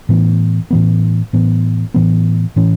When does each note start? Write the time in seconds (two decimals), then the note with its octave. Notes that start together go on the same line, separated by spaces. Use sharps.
0.09 A2 E3 B3
0.71 A2 E3 B3
1.33 A2 E3 B3
1.94 A2 E3 B3
2.56 A2 E3 C#4